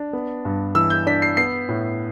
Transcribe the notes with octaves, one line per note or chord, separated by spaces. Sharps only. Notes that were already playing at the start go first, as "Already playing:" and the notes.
Already playing: D4
B3
G2
E3 E6
G6
D4 B6
C7
B3 C7
A2